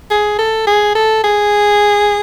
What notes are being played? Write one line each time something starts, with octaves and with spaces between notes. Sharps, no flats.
G#4
A4
G#4
A4
G#4